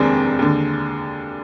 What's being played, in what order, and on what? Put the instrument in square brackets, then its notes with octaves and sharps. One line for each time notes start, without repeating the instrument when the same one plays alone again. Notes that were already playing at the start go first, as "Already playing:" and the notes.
Already playing: [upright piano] F1 D#2 D#3 G#3 C4 D4
D#2 D3